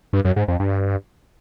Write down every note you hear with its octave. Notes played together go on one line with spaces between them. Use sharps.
G2
F#2
G#2
F2
G2